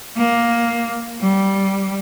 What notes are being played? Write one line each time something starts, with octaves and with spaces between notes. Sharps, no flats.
A#3
G3